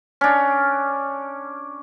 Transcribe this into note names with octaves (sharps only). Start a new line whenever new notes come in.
C#4 D4